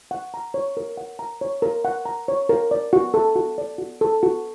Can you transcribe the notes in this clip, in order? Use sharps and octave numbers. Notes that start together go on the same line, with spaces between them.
F#5
A#5
C#5
A#4
F#5
A#5
C#5
A#4
F#5
A#5
C#5
A#4
D5
F#4
A4
F#4
D5
F#4
A4
F#4